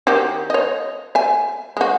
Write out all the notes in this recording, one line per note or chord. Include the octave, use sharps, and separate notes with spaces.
D#3 F#4 G4
C#5 D#5
E5 G#5
G#3 F#4